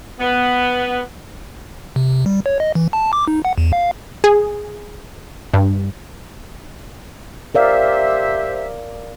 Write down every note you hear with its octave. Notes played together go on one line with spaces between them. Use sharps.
B3
C3
G3
C#5
D#5
E3
A5
D6
D#4
F#5
E2
F5
G#4
G2
G4 A#4 C5 D5 E5 F5